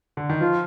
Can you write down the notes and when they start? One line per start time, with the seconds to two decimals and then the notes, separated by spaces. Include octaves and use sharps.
0.17 D3
0.29 D#3
0.40 F3 F4